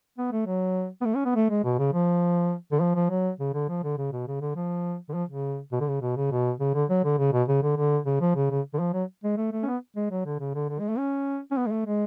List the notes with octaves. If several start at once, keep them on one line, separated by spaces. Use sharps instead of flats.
B3
A3
F#3
B3
A3
C#4
B3
A3
G#3
B2
C#3
F3
D3
F3
F3
F#3
C#3
D3
F3
D3
C#3
B2
C#3
D3
F3
D3
F3
C#3
B2
D3
C#3
B2
C#3
B2
C#3
D3
F#3
D3
C#3
B2
C#3
D3
D3
C#3
F3
C#3
C#3
D3
F3
F#3
G#3
A3
A3
C#4
B3
G#3
F#3
D3
C#3
D3
D3
G#3
A3
C#4
C#4
B3
G#3
A3
G#3